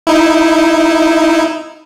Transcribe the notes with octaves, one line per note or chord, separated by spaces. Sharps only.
D#4 E4